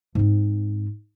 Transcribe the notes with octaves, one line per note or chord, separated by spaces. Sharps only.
G#2 C4